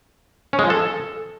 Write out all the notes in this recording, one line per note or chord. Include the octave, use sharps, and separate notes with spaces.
C#4
G#3
F3
A4